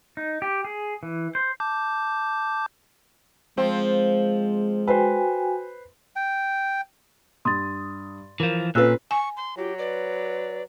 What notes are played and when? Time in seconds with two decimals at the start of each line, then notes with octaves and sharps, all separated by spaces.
0.17 D#4
0.42 G4
0.65 G#4
1.03 E3
1.35 C5
1.60 A5 D6 G6
3.57 F3 G#3 C4 C5
4.88 F#4 B4 C5 G5 G#5
6.16 G5
7.45 G2 C6 D#6 A6
8.40 E3 F3 A#4
8.75 A#2 C4 C#4 F4 A4 B4 E6 F#6
9.11 G#5 C#6
9.37 C6
9.57 F#3 F4 G4
9.78 B4 D5